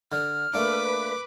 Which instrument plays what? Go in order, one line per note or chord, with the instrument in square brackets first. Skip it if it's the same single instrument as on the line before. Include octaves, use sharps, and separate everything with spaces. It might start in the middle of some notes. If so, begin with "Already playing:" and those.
[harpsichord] D3 [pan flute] F6
[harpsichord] A3 A#3 D4 [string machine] B4 B6 [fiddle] D6